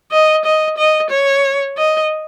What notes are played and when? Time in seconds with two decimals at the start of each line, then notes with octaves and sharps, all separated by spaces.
0.12 D#5
0.45 D#5
0.77 D#5
1.10 C#5
1.77 D#5